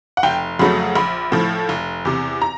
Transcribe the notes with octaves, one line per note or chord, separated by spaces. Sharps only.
F#5
F1 G5
F2 C#3 F#3 A3 B5
A#1 B5
A2 F3
F1
E2 C3
A#5